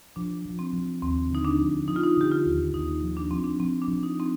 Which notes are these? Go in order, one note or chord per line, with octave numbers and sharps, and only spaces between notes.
F3 D4
F3
C4
F3
D#2 C4
D3 D#4
D4
F3
F3 D#4
F4
D#4
D3 G4
F4
D#2
D#2 D#4
F3
D4
F3 C4
D4
F3 C4
D4
F3
D#4
C4